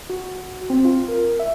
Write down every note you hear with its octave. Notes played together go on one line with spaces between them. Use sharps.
F#4
C4
F4
A#4
E5